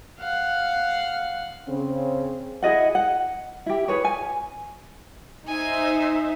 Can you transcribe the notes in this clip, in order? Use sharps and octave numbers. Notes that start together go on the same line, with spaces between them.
F5 F#5
C#3 C4
E4 G#4 D#5 F#5
F#5
E4 G4
G#4 B4 C#5
G#5
D#4 C5 E5 G#5